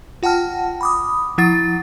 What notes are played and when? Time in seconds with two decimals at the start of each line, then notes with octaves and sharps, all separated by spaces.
0.23 F4 F#5 G5 A5 F6
0.81 B5 D6 D#6
1.38 F3 E4 F#5 A6